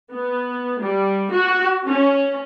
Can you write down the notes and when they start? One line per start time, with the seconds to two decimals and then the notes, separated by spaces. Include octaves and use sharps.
0.11 B3
0.79 G3
1.30 F#4
1.83 C#4